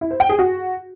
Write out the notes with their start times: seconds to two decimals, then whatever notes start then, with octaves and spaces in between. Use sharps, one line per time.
0.01 E4
0.11 C5
0.20 G5
0.29 G#4
0.39 F#4